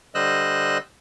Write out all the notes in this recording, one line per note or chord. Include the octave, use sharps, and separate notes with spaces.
D3 G3 C5 D#5 E6 F#6